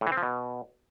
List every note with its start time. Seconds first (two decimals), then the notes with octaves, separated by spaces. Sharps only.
0.01 A2
0.07 E3
0.12 C4
0.17 F3
0.23 B2